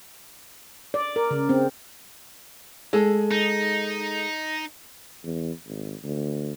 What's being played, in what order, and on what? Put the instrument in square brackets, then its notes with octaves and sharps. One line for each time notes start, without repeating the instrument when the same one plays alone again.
[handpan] D5
A#4
C#3
C4
[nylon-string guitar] G#3 A4
[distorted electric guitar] D#4
[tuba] E2
G#1
D2